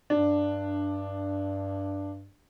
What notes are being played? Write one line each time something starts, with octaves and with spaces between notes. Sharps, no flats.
G2 D4